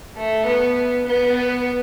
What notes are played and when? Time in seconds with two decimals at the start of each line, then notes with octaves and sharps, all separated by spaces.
0.17 A3
0.47 B3
1.06 B3